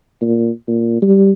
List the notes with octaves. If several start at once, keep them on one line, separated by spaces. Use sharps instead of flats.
A#2
A#2
G3